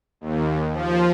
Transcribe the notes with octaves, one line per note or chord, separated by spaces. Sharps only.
D#2
F3